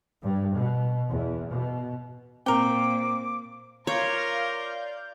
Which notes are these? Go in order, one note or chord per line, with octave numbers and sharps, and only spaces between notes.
G2
B2
E2
B2
A#2 C4 A#4 G5 D6
F4 A#4 C#5 D5 F5 G6